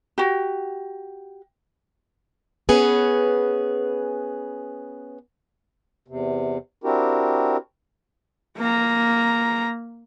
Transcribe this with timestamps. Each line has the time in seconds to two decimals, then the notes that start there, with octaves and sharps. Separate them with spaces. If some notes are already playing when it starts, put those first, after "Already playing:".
0.18 F#4 G4
2.69 B3 C#4 G#4 B4
6.08 E2 C3
6.84 C4 D4 E4 F#4 G4 A#4
8.58 A#3 A#5